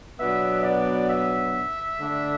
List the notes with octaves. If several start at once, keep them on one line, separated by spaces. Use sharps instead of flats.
B2 F#3 B3 D4 E5
D5
E5
D3 A3 D4